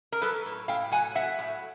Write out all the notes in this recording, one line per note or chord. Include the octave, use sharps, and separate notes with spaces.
A#4
F#3 A4 B4
A2
A2 F5 G5
F#3 F#5 G#5
F#3 E5 F#5
A2